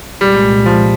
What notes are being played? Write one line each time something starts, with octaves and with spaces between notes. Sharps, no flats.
C2 A#2 G3 G#3
F3